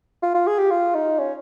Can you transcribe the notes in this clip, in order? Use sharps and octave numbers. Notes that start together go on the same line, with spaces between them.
F4
F4
G#4
G4
F4
D#4
C#4